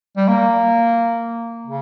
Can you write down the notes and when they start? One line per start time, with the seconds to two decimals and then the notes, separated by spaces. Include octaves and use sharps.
0.17 G3
0.28 A#3
1.67 C#3